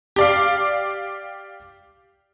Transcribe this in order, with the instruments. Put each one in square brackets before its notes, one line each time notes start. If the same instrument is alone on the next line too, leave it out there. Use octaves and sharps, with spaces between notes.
[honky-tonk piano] G4 D5 F5